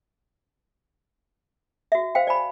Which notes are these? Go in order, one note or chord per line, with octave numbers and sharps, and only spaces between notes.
F#4 E5
C5 F5 G5
D5 G#5 B5